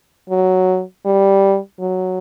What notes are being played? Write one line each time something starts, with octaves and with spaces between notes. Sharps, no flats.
F#3
G3
F#3